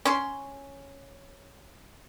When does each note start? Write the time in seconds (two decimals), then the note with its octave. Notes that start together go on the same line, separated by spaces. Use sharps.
0.05 C#4 C6